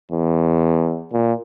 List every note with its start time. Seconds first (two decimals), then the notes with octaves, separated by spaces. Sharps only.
0.11 E2
1.13 A#2